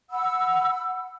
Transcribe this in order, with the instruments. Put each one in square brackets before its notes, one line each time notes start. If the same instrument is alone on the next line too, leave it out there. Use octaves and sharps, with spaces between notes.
[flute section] F#5 B5 E6